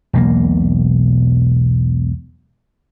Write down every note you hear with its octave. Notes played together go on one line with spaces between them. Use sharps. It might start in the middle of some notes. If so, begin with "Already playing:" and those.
E1 B1 A#3